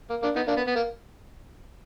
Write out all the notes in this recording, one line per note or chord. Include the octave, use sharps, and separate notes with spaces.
A#3
A#3 D4
B3 D#4
A#3 D4
B3
B3
A#3